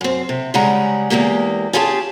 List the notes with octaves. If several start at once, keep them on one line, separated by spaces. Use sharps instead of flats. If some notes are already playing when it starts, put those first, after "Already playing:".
F#2 C4
C3
C#3 G3 G#3 C#4 F#5 A#5
E2 C3 G#3 A#3 G4
C#4 F4 G4 G#4 F#5 A5